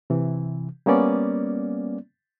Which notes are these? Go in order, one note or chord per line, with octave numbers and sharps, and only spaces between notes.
C3 E3
G3 A#3 B3 C#4 D5